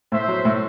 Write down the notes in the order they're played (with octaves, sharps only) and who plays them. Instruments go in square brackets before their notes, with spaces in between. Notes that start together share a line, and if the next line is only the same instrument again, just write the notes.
[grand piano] A2 [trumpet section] C5 E5
[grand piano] F#3
A2